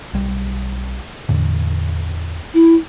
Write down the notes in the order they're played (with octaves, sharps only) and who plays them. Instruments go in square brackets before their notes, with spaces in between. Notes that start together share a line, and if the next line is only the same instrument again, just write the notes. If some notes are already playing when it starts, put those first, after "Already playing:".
[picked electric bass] B1 G3
E2 A2 D3
[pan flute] E4